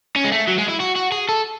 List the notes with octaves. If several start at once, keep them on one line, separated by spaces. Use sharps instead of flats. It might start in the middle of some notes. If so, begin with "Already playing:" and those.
C#4
G#3
A3
F#3
G#3
E4
F#4
F#4
G#4
A4